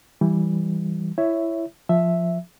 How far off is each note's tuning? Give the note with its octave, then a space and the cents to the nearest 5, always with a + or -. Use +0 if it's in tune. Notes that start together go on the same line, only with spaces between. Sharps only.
E3 +0 G3 +0
E4 +15 C#5 +0 E5 +0
F3 +0 E5 +0